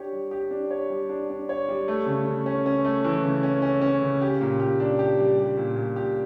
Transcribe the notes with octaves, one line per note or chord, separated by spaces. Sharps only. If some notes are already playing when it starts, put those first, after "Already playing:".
Already playing: D4 G4 C#5
G3
G4
D4
C#5
G3
D4
D4
C#5
G3
A3
C#3
C#3
C#4
C#4
A3
E3
C#3
C#4
C#4
C#4
C#3
G4
A#2
G4
D4
G4
G3
G3
A#2
A#2
G4